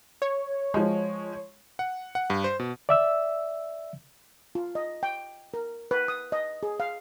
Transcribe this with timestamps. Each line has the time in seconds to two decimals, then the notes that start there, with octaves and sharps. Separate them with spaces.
0.22 C#5
0.74 F3 G#3
1.79 F#5
2.15 F#5
2.30 G2
2.44 C5
2.60 B2
2.89 D5 E5 E6
4.55 F4
4.75 D#5
5.03 G5
5.54 A#4
5.91 B4
6.08 D#6
6.32 D#5
6.63 G#4
6.80 F5